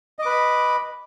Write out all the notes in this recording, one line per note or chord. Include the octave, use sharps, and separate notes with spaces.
B4 D#5 B5 D6